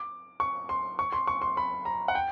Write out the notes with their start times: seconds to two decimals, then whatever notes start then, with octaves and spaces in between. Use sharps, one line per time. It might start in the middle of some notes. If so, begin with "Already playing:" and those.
Already playing: D6
0.40 C#6
0.69 C6
0.99 C#6
1.12 C6
1.27 C#6
1.42 C6
1.57 B5
1.85 A#5
2.08 F#5
2.15 G5